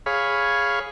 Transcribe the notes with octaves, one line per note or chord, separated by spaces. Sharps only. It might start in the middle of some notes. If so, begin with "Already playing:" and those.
G#4 C#5 F5 B5